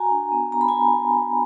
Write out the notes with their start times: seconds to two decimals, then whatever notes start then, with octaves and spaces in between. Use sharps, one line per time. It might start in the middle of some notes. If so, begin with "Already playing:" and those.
Already playing: F#4 G#5 A#5
0.11 D4
0.32 B3
0.52 B3 A#5
0.61 B5
0.68 G#5 A#5